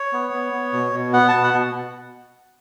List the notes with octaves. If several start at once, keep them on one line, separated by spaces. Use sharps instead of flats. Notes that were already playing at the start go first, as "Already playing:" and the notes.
Already playing: C#5
B3
B3
B3
B2
B2
B3 F#5
B2 A5
F#5
B2